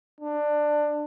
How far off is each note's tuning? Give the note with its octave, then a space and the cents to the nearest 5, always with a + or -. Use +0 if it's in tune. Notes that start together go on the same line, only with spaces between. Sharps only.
D4 +15